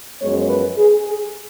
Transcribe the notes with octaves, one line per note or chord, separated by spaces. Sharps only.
F#2 F3 G#3 B3 C#5
B4
G#4
G#4